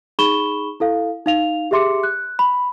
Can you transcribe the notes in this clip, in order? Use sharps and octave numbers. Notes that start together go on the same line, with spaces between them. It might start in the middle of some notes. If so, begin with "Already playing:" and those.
D#4 G#4 B5 C#6 E7 G7
E4 A4 F5
D#4 F5 F7
G4 G#4 E5 C6 D6 C#7
F#6
B5